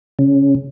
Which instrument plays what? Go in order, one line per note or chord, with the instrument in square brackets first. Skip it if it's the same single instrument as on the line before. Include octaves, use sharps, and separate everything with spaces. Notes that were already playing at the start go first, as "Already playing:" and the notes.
[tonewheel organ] C#3